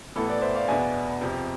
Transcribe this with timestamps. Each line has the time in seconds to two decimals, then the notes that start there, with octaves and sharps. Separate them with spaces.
0.16 A1 A2 E3 B3 A4
0.29 B4 D5
0.41 C5 E5
0.55 D5 F5
0.68 E2 B2 B3 D4 E5 G#5
1.21 F2 C3 F3